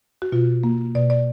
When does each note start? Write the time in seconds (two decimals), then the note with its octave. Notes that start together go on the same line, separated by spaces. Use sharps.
0.22 F#4
0.32 B2 F4
0.64 A#3
0.95 B2 D5
1.10 D5